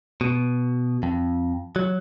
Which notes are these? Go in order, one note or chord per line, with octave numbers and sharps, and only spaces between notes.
B2
F2
F#3